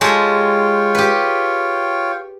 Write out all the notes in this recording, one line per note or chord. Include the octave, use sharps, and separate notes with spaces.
G#3 F4 G4 A4 C#5 G5
G4 B4